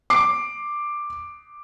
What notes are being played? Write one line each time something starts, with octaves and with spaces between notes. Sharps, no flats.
D6 C7